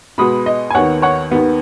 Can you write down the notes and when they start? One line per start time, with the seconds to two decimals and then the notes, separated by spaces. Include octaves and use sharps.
0.18 B2 G#3 B3 B5 D#6
0.46 D#5
0.70 G#5
0.74 D#2 D#3 B3 C#5 F#5
1.02 C#5 F#5
1.31 D#2 D#3 B3